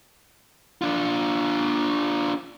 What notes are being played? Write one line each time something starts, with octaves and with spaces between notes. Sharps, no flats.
D4 F4